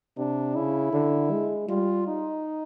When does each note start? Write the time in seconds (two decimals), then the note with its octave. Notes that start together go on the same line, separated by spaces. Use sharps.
0.17 C3 D4
0.55 C#3 E4
0.93 D3
1.31 G#3
1.68 G3 F4
2.07 D#4